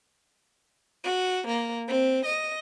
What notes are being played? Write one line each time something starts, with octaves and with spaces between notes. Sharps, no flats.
F#4
A#3
C4
D#5